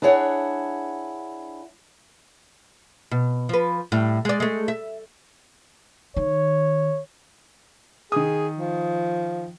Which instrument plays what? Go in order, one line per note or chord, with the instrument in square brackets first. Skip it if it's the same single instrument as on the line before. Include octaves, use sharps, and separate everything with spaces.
[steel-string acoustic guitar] D4 E4 G#4 C#5 F#5
[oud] B2
F3 B4
A2 G3
G#3 D5
G#3 A3
E5
[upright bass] D#3 [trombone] C#5
[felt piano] D#3 D#6 [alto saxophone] G#4
[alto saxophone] F3